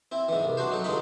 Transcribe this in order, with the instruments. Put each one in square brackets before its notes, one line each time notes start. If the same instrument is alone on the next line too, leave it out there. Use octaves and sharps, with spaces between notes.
[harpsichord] C4 E4
G#2 E3
C2
D4 F#4 C5
F#3 D#4 A4
G2 D3 G#3 D#4 F4 B5